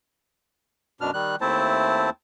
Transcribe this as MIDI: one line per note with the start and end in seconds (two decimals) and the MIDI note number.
1.01 1.11 42
1.01 1.11 47
1.01 1.11 62
1.01 1.11 89
1.14 1.36 51
1.14 1.36 55
1.14 1.36 90
1.41 2.10 39
1.41 2.10 57
1.41 2.10 60
1.41 2.10 64
1.41 2.10 72
1.41 2.10 81